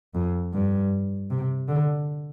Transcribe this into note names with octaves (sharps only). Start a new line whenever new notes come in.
F2
G2
C3
D3